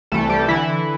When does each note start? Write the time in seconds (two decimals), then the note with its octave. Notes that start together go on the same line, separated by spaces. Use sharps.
0.12 C2 C3 E3 A3 A4
0.29 G3 G4
0.48 D3 E3 E4